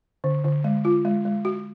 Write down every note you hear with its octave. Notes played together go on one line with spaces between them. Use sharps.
D3
D3
G#3
F4
G#3
G#3
F#4